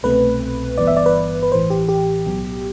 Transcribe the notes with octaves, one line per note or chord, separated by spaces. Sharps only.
C2 B2 A3 C4 B4
G1 G2 E3 B3 D5
E5
D5
B4
B4
A1 A2 E3 C5
G4
G4
B1 A2 F#3 B3